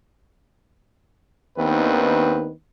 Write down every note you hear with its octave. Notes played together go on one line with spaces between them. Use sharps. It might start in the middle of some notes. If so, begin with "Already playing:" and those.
D#2 D#3 B3 C4 D4 B4